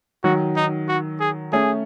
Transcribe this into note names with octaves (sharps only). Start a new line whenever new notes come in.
D#3 F#3 F#4
D#4
F#4
G#4
A3 C#4 G#4